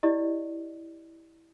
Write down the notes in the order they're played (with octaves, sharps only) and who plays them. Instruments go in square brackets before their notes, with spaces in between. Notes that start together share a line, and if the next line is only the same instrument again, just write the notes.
[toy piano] E4 G4 D5 D#5